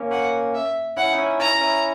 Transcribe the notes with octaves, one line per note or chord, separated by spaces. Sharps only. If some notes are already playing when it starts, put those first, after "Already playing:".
Already playing: A#3 C#4
A#3 C#4 F#5
E5
C#4 E4 F#5
D#4
C#4 E4
C#4 E4 A#5
C#4 E4